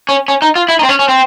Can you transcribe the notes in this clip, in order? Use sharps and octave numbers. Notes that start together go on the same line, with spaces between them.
C#4
C#4
D#4
F4
E4
D#4
C4
C#4
C#4
C4